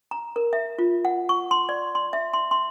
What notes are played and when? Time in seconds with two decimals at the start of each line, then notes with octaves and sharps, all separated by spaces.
0.11 A#5
0.36 A#4
0.53 E5
0.79 F4
1.05 F#5
1.29 C#6
1.51 C6
1.69 D5
1.95 C6
2.13 E5
2.33 C6
2.51 C6